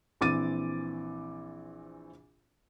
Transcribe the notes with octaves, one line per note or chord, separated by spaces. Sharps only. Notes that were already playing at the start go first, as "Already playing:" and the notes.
A#1 E3 C4 D6 A6 D#7